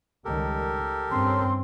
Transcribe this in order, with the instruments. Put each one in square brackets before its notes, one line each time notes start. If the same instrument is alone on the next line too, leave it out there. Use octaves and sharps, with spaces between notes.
[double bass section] C#2 D#3 G3 [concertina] G4 A4 A#4
[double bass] G2 C4 [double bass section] C#4 [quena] C6